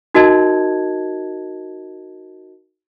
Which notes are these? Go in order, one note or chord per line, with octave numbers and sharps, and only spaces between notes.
D#4 F#4 A#4 D#5 A5 G#6